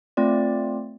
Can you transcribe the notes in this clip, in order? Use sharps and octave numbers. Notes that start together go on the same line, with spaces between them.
A3 C4 F4 D5